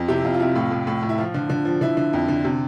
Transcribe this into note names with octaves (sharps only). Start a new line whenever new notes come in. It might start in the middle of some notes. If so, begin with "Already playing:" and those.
Already playing: F2 F3
C3 E4 G4
F2 F4
F4
C3 E4
A2 F4
A2
A2
A2
E4
F3 F4
D3
D3
F3
D3 E4
D3
F2
D3
C3